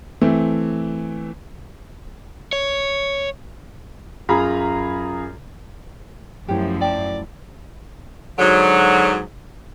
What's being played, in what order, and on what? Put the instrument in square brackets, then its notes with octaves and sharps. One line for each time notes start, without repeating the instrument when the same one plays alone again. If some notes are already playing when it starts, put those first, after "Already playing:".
[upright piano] E3 A3 C4
[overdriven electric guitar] C#5
[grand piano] F#2 F4 G#4 A#5 B5
[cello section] F#2 F3 [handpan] A3 E4 [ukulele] G4 C5 C#5
[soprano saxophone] D5 [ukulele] G5 A5
[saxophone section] G#2 D3 F#3